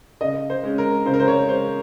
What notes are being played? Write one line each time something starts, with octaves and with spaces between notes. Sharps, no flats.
C#3 D#5
C5
G#3 C#4
A#4
C#3 C5
A#4
C5
C#5
G#3 C#4 C5